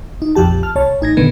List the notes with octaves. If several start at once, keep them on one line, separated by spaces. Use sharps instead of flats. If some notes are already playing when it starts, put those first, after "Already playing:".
D#4
A#1 F2 F3 G4 A5
A5 F6
C2 C#5 A5
A1 D#4 G#6 A#6
A#2 D3 D#3 B3 G#6